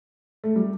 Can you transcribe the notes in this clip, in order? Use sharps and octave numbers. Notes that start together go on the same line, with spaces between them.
A3
G3